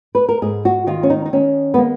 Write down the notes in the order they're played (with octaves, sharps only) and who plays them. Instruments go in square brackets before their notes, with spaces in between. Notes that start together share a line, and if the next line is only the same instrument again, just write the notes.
[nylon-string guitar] B4
A#4
G#2 G#4
F#4
D#3 F4
C#4
D#4
D#4
D#3 C#4
B3
G#3 A#3